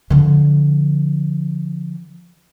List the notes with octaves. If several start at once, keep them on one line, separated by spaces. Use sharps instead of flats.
D3 F3